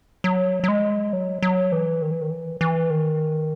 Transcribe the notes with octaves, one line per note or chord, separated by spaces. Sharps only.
F#3
F#3
G#3
F#3
F#3
E3
D#3
E3
D#3
E3
E3
D#3